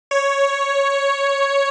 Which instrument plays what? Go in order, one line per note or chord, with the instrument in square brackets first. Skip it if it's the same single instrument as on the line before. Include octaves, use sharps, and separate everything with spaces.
[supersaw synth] C#5